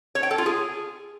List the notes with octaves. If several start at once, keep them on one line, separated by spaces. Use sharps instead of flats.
C#5
G5
A4
F4
G#4